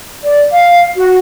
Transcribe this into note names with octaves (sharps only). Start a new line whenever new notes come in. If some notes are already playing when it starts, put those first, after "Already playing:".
D5
F5
F#4